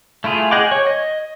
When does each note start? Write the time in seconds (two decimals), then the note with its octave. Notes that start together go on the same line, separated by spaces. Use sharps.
0.24 A3 E4 F4 G#4
0.51 G#4 D#5 F#5 G5 D6
0.71 C#5
0.87 D#5